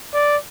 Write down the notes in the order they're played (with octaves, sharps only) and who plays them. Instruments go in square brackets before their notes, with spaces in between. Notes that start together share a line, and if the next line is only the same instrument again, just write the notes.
[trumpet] D5